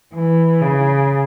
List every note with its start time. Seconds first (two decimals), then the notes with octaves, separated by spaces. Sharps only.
0.14 E3
0.61 C#3